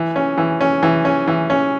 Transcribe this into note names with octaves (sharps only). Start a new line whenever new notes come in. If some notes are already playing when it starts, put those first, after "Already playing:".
Already playing: E3
C#4
E3
C#4
E3
C#4
E3
C#4